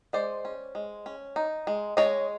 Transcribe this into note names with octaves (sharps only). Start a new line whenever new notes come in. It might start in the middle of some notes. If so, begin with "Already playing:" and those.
G#3 C5 D5
C#4
G#3
C#4
D#4
G#3
G#3 C#5 D#5